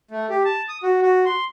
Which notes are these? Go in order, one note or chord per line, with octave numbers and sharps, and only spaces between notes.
A3
G4
A5
D#6
F#4
F#4
C6